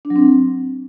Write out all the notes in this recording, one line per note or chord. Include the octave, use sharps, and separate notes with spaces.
D4
F#3
C4